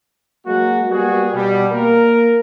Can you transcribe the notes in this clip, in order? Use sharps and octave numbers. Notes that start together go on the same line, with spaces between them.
F#3 G#3 A#3 F#4
G3 A#3 B3 F#4 G#4
B2 G3
A#3 A#4